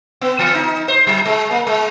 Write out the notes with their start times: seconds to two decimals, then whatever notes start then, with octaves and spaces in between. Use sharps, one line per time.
0.21 B3
0.39 E3
0.55 D#4
0.88 C5
1.07 F#3
1.26 G#3
1.51 A#3
1.67 G#3